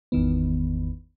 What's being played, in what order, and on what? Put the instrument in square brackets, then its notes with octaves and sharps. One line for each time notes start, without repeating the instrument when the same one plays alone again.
[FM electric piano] G#1 E2 D#3 B3